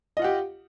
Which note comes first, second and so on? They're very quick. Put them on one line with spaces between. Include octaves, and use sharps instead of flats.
D#5 F4 F#5 G4